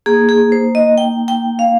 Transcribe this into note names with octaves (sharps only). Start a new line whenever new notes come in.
A#3 G#4
D#4
G#4
C5
D#5
G5
G5
F5